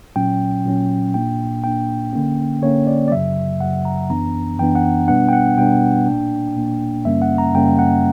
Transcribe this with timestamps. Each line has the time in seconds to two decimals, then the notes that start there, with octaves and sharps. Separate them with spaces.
0.16 A#2 F#3 C#4 G5
0.66 A#2 F#3 C#4
1.14 A#2 A#3 D4 G5
1.64 A#2 A#3 D4 G5
2.13 D3 A#3 C#4
2.62 D3 A#3 C#4 C#5
2.87 D5
3.08 D5
3.11 F#2 C#3 F#3 E5
3.61 F#2 C#3 F#3 F#5
3.85 A#5
4.10 F#2 E3 B3 D4 A#5
4.59 F#2 E3 B3 D4 G5
4.75 F#5
5.08 B2 G3 B3 D4 F#5
5.29 G5
5.33 F#5
5.58 B2 G3 B3 D4 G5
6.06 A#2 A#3 D4
6.56 A#2 A#3 D4
7.05 F#2 C#3 G3 A#3 C#4 E5
7.22 F#5
7.38 A#5
7.54 F#2 C#3 G3 A#3 C#4 G5
7.79 F#5